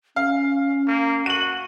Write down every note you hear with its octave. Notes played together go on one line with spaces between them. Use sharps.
C#4 F5
A#3
F#4 D#7 F#7